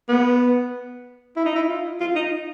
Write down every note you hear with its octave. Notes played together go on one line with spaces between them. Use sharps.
B3
E4
D#4
E4
F4
F4
D#4